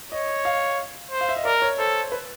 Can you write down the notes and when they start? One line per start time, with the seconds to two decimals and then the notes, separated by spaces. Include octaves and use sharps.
0.12 C#5 D#5
0.45 F5
1.11 C5
1.21 F5
1.29 E5
1.37 D#5
1.45 A#4 D5
1.62 C#5
1.78 A4 C5
2.12 B4